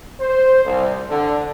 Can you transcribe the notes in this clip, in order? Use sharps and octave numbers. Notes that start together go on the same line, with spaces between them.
C5
C2
D3